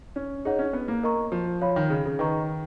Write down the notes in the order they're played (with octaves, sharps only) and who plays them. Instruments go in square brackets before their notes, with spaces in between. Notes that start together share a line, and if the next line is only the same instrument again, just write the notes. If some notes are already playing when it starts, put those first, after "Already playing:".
[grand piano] C#4
[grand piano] D#4 [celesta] G#4 C#5 F#5
[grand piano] C#4
B3
A#3
[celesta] A#4 D#5 A#5 C#6
[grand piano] F3
[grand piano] F3 [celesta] C#5 F5 B5
[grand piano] D#3
C#3
C#3
[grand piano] D#3 [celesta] B4 D#5 A#5 C#6